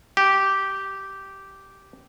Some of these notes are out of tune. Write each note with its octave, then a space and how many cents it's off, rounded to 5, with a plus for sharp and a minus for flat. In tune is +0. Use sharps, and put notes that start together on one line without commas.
G4 -10